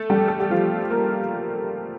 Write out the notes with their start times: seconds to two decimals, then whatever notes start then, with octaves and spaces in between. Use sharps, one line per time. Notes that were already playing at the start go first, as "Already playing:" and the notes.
Already playing: A3 A4
0.10 G3 G4
0.28 A4
0.40 G4
0.50 F3 F4
0.90 A#3 A#4